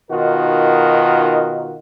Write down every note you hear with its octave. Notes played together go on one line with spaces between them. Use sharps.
B2 D#3 D#4 F4 F#4 A#4